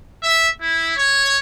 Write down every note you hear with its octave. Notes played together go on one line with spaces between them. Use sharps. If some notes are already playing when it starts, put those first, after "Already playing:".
E5
E4
C#5